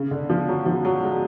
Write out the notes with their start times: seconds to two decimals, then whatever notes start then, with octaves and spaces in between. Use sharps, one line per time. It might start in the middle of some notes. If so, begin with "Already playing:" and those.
Already playing: C#3
0.11 D3
0.30 F3
0.48 F#3
0.66 F3
0.85 F#3
1.03 G#3